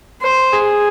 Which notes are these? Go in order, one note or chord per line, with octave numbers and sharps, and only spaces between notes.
C5
G#4